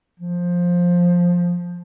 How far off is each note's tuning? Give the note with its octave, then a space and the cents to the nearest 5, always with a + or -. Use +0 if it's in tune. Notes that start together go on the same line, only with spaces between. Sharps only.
F3 +10